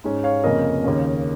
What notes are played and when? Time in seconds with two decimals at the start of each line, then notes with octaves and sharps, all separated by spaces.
0.04 G#2 G#3 C#4
0.24 C#5 F5
0.44 F1 F2 C#3 A#3 C#4 A#4 D#5
0.84 D#2 C#3 A#3 C#4